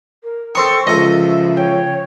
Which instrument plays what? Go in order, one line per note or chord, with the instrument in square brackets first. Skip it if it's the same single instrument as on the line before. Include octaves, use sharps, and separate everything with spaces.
[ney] A#4
[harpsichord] C4 D#6 [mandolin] A4 C6 C#6 [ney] G5
[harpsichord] C#2 A4 [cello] C#3 F3 [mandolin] D#5 [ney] E5
[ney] C#5 [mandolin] G5